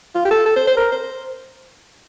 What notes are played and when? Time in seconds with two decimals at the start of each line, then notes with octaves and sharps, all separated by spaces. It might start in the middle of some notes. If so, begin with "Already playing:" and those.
0.15 F4
0.25 G4
0.31 A4
0.46 A4
0.56 C5
0.67 C5
0.77 A#4
0.92 C5